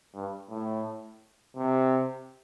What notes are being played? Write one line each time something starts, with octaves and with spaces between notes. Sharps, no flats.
G2
A2
C3